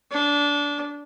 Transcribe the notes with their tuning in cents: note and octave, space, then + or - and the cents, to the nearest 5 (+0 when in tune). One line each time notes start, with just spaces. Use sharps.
D4 -20